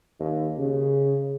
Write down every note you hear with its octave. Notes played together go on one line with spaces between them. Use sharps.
D#2
C#3